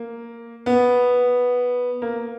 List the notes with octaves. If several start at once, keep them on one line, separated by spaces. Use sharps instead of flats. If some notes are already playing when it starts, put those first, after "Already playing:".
Already playing: A#3
B3
A#3